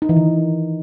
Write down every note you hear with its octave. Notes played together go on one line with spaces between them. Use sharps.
D#4
E3
D#3